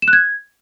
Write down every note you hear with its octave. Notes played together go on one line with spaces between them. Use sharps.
E7
F#6
G#6